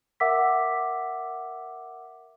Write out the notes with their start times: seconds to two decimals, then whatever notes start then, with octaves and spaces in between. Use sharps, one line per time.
0.20 A#4 E5 F#5 D6 E6 B6